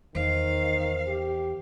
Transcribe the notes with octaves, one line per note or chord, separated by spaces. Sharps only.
E2 D#3 C5 F5
G4